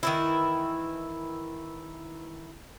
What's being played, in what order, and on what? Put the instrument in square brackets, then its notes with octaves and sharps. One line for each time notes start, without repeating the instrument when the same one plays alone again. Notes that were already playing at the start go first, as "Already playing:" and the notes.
[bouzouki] D#3 E3 E4